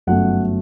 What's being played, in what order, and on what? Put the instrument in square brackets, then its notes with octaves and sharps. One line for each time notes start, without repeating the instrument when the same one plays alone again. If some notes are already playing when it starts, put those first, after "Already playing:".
[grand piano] G1 F#2 F#3 A3 F#5